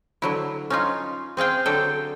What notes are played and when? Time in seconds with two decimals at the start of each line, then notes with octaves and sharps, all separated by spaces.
0.22 D3 F#3 E4
0.70 C#4 D#4 F4
1.37 C4 G#4 F5 G5
1.66 D3 F#3 A4 G5